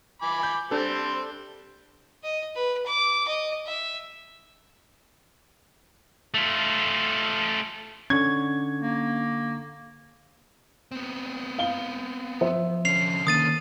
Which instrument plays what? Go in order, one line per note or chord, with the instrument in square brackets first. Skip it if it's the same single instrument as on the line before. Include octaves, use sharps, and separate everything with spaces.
[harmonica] G#5 B5 D6
[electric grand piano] G6
[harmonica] G3 C4 C5 [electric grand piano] D4 A4
[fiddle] D#5
B4
D6
D#5
E5
[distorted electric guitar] A3 F4
[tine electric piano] D3 C#6 [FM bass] C#4 [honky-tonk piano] G#6
[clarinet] A#3
[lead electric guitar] B3 C4
[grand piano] F5 G7
[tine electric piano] F3 [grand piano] C5 E5
[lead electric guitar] D3 C#4 [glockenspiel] C7 F7
[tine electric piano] D#3 A#3 [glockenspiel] D#6 A6 D#7